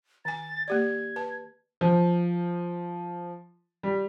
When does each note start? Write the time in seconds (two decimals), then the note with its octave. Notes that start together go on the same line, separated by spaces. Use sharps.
0.25 D#3 G#5 A6
0.68 A#3 G4 D5 G#6
1.16 B4 A5
1.81 F3
3.83 G3